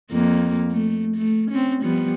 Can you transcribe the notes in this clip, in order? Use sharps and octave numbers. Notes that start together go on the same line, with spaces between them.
F2 A#3
A3
A3
C4 C#4
F3 G3 B3